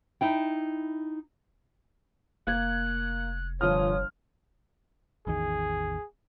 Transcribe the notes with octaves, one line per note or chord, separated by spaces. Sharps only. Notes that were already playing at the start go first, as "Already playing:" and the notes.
D#4 E4 G5
F1 A#3 F#6 G#6
G1 F3 C#5 D#6 F6
A1 E2 D#3 G#4